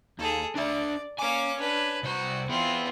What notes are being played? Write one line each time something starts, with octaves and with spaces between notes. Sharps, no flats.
D#2 G#4 A4
D4 D5 E5
A#3 C#5 G#5 D6
D4 B4
C2 F#4 C5
B3 C4 E4 F4